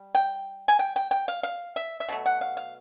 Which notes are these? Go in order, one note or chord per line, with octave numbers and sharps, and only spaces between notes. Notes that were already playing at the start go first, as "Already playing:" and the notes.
Already playing: G3
G5
G#5
G5
G5
G5
F5
F5
E5
E5
B2 F#3 A3
F#5
F5
F5